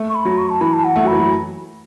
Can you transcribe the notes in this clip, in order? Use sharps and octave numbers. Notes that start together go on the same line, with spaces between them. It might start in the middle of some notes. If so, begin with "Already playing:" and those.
Already playing: A3
C#6
B5
F#3
C#6
A5
E3 B5
A5
F#5
A3
F#3 B5
E3
F#3